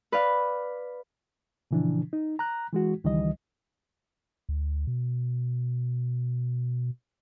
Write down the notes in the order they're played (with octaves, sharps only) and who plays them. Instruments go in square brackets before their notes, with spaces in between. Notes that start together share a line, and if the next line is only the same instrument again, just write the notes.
[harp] B4 D5 F5
[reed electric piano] A#2 C#3 E3 F3 D4
D#4
A#5 F#6
E3 G#3 F#4
C#2 D#3 E3 G3 D#5
[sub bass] D2
B2